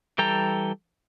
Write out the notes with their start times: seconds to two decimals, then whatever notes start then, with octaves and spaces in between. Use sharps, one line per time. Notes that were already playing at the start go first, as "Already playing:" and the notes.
0.18 E3 G3 A4 G5 A#5